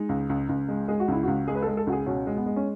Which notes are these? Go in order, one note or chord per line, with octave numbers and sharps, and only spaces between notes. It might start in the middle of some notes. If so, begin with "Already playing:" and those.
Already playing: G#3 D#4
C#2
C#2
C#2
G#3
G#3 G#4
F#4
C#2 E4
C#2 F#4
G#3 G#4
B4
G#3 A4
A4
C#2 F#4
G#4
B2 C#4
G#3
B3
G#3
C#4